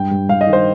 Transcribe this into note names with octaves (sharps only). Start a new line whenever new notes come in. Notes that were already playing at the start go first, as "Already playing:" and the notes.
Already playing: G2 G5
G2
G2 F5
D#5
D#3
C5